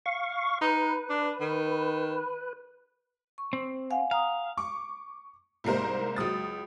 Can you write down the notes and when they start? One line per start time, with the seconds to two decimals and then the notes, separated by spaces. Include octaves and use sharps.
0.06 F5 C#6
0.61 D#4 B4
1.10 D4
1.40 D#3
3.38 C#6
3.53 C4
3.90 F5 F#5 G#5
4.11 F5 A#5 D#6
4.57 C#6 D6
5.64 C2 G#2 A#3 A#4 C5
6.16 C#2 F#3 D#6 A6